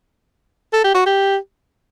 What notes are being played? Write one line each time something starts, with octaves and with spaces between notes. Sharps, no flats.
A4
G4
F#4
G4